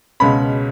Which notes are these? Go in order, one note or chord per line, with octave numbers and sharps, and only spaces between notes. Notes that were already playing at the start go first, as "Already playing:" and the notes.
C#2 B2 G#3 C#4 B5